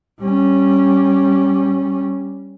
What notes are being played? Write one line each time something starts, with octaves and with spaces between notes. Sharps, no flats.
G3 C#4